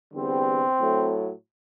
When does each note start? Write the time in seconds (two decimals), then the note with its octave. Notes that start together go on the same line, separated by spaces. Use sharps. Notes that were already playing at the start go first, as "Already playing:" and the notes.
0.13 E2 D3 G3 C4
0.79 A2 F#3 A3